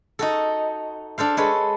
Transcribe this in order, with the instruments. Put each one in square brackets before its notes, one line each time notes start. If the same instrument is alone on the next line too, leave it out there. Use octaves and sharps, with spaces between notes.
[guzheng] D#4 F#4 A4
D4 A4 C5 F5
G#3 A4 B4 C#5